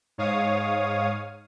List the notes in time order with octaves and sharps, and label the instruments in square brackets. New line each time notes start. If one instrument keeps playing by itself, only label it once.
[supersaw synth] G#2 C#5 F5 D#6